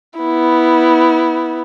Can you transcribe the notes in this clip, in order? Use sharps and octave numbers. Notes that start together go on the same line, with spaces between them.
B3 E4